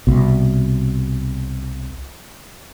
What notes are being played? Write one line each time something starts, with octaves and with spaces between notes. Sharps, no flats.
C2 B2